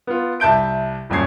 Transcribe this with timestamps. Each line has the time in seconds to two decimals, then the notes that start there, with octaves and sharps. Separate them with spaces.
0.07 B3 F4
0.40 C2 E5 A5 G6 D7
1.10 D#1 F#2 A#2 C#4 G#6 C7